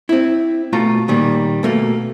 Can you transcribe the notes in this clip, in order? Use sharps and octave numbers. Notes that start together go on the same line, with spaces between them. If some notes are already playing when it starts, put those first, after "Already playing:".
C4 E4
B2 A3 F4 A#5
A#2 D#3 G3 A#3
B2 A3 A#3